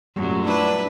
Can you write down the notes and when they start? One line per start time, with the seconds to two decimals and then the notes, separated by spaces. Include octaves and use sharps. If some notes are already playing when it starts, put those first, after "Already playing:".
0.16 F#2 A#2 G3 A3
0.45 D4 E4 B4